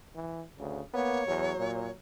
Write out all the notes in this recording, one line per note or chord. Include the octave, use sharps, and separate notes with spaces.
E3
D2 C#3
A#3 B3 C#5
E2 F#3
A#2